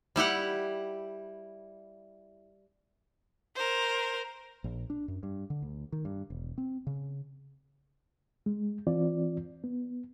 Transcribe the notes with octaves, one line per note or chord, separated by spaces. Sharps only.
G3 E4 G4 F#5
A#4 C5
A#1
D4
F#2
G2
D3
D2
D#3
G2
E1
C4
C#3
G#3
E3 C4 F4 D5
B3